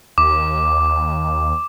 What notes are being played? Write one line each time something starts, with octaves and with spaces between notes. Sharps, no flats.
D#2 D6